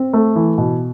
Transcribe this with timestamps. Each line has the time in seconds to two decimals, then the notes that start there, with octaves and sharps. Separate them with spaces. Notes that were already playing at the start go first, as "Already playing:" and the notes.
Already playing: C4
0.13 A3
0.36 E3
0.58 B2